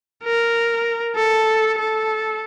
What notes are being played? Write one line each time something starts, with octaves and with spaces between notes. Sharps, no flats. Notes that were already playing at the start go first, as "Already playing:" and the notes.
A#4
A4
A4